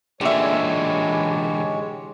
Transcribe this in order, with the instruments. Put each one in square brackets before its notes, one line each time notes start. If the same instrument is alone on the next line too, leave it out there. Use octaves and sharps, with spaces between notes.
[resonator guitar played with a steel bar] A#2 E5 [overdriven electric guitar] D3 E3 [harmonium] G#3 C#5 [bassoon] G4